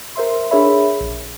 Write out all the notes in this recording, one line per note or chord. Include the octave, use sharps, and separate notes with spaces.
A#4 C5 E5 C6
D4 G#4 A#4 C#5 E5 B5
A#1